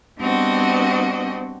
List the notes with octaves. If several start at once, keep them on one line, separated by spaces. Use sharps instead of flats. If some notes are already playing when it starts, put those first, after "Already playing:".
G3 B3 C4 D4 F#4 D#5